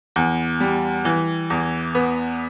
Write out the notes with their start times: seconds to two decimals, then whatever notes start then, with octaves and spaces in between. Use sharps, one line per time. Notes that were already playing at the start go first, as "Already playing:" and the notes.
0.16 E2
0.60 G3
1.05 E3
1.50 E2
1.95 B3